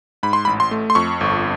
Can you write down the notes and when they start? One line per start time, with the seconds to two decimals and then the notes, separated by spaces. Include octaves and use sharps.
0.23 G#2 B5
0.33 C6
0.45 A1 B5
0.60 C6
0.71 A3
0.90 C6
0.95 F2 C#6
1.21 G1